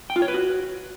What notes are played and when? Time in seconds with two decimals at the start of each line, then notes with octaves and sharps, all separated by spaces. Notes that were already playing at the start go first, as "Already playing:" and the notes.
0.10 G5
0.16 F4
0.22 C#5
0.28 B4
0.34 F#4